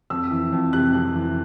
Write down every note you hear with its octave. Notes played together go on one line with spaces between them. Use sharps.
F2 E6
E3
F2
C3 F#6
F2
E3